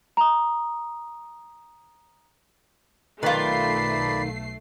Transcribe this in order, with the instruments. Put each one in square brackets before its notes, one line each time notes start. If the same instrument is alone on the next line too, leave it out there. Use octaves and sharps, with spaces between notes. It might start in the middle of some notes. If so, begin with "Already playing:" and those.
[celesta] A#5 D#6
[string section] B1 A3 C7 [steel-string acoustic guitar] D#3 [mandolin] F4 B4 [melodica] D5 B5